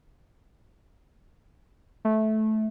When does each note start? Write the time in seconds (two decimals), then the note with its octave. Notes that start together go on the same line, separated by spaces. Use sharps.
2.05 A3